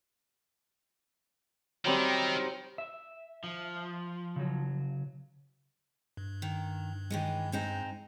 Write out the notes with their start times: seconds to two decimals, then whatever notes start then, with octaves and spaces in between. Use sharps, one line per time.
1.85 D#3 F#3 G3 C4
2.78 E5
3.44 F3
4.36 C#3 F#3
6.17 G2
6.42 D#3
7.10 D#3 E3 G#3
7.52 G#3 C4 D#4